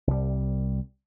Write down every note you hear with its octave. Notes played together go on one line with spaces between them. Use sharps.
C2 G3